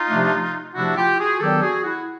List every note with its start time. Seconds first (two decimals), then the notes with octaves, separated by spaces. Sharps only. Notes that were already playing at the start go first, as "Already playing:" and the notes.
Already playing: D#4 F4
0.09 C3 F3 A3 D4
0.75 C3 F3 A3 D4 E4 F#4
0.96 F4 G4
1.18 F#4 G#4
1.40 D#3 F#3 B3 D4 G4 A4
1.62 F#4 G#4
1.84 E4 F#4